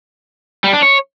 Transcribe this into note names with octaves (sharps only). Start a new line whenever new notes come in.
G3
D4
C#5